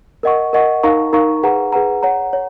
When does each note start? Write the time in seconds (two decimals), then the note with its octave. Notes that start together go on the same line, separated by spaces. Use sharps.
0.23 A#4 D#5 F#5 C#6
0.53 A#4 D#5 F#5 C#6
0.83 D#4 A#4 F5 A#5 C#6
1.13 D#4 A#4 F5 A#5 C#6
1.43 G#4 B4 F#5 A#5
1.72 G#4 B4 F#5 A#5
2.02 C#5 F#5 A#5
2.33 C#5